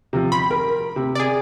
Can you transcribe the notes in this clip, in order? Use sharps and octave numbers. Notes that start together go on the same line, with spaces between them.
C3 F3
B5 C6
A#4
C3
G#4 D5